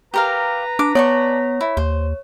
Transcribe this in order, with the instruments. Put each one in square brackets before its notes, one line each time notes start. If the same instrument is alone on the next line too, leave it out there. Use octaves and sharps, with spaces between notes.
[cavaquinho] G4 A#4 F5 [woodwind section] B4 A#5
[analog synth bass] D4 [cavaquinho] D6
[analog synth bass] B3 [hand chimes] C#5 [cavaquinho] D5 A5 C#6
[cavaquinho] E4
[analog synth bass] D#2 [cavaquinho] C5